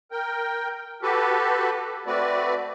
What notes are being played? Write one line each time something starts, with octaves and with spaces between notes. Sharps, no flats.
A#4 G5
F#4 G4 A4 B4
A3 C4 F#4 B4 D5